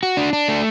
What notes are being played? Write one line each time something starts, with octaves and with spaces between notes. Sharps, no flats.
F#4
D4
D4
A3